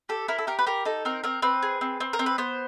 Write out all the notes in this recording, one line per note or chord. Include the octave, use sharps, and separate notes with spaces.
G4 A4
E4 A#4
A4
G4 A#4
B4
G4 A#4
D#4 A4
C4 A#4
C4 A#4
C4 B4
G#4
C4
C4
A#4
C4
B4
B3 C5